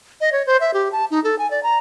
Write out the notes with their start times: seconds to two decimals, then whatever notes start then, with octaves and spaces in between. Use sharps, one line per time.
0.21 D#5
0.32 C#5
0.46 C5
0.61 E5
0.74 G4
0.92 A5
1.11 D#4
1.24 A4
1.39 G#5
1.51 D5
1.63 A#5